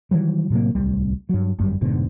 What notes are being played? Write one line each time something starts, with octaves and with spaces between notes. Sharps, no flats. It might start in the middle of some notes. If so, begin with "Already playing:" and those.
D#3 E3 F#3 G3
A2 C3 F#3 A#3
D1 C2 G3
G2 F#3
G1 F#2 G3
F1 G#2 B2 D3